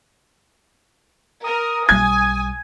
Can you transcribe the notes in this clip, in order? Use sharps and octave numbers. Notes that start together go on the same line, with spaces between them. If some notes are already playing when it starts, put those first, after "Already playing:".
A#4 D#6
B1 G3 G#5 G#6